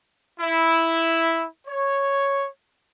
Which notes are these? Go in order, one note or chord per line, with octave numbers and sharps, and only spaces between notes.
E4
C#5